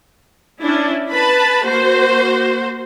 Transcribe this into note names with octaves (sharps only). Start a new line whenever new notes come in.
C#4 D4 E4
B4 A5 B5
A#3 F#4 C5